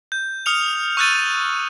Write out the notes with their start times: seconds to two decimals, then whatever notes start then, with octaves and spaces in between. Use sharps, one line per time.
0.12 G6
0.46 D#6 F6 C#7 F7
0.97 C#6 E6 F#6 G6 A6 D#7